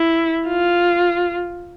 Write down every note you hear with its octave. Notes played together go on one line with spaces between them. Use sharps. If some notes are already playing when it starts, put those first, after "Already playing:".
Already playing: E4
F4